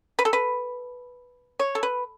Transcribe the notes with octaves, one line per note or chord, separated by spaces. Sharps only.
B4
A4
B4
C#5
A4
B4